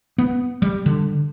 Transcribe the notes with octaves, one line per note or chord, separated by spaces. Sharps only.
B3
G3
D3